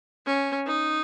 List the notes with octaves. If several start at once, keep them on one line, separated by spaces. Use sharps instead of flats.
C#4
D#4